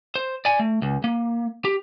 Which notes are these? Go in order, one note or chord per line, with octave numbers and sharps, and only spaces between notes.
C5
D5 G#5
A3
C#2
A#3
G4